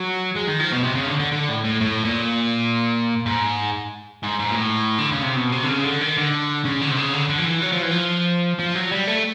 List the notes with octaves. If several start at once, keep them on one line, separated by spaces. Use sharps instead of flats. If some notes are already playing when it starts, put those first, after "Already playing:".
Already playing: F#3
G#3
D#3
F3
B2
C3
C#3
D3
D3
D3
A2
A2
A2
A#2
G#2
G#2
G#2
A#2
A2
D3
C#3
C3
B2
C3
D3
C#3
D3
D#3
D3
C#3
D3
C3
C#3
D3
D3
F3
E3
F#3
F3
E3
F3
F3
F#3
G3
A3